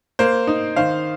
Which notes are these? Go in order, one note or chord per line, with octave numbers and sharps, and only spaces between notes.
A#3 C5
D#4
D#3 C5 F5